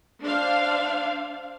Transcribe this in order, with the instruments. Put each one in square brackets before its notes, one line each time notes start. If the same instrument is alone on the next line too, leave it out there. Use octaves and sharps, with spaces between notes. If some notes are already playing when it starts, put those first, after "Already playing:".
[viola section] D4 C5 F5